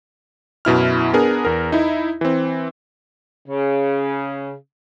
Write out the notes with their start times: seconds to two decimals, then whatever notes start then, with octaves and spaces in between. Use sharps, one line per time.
0.65 F#2 B2 E4 F6
1.14 B3 D4 G#4 A#4
1.45 E2 A#4
1.72 D#4 E4
2.21 E3 C4
3.47 C#3